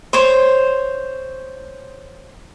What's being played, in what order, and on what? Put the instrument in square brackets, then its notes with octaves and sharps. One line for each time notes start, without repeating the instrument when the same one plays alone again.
[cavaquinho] C5 C#5